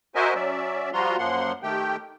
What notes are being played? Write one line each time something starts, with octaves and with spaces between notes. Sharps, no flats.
F#4 A#4 C5 D#5 E5 G#5
F#3 C#4 D5 E5
F3 G3 F4 F#4 A#5 C6
F#2 F3 A#3 F#5 C6
D#3 A3 G4 G5